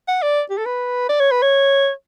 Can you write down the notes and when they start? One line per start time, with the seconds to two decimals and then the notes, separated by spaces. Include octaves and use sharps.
0.08 F#5
0.22 D5
0.50 G4
0.58 A4
0.65 B4
1.09 D5
1.20 C#5
1.31 B4
1.42 C#5